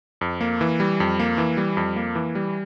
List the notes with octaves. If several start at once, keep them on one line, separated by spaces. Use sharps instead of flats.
F2
A#3
E3
G3
F2
A#3
E3
G3
F2
A#3
E3
G3